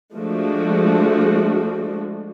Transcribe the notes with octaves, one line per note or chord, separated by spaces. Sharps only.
F3 G#3 A3 D4 F#4